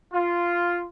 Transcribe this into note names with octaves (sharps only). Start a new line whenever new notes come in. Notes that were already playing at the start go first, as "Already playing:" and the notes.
F4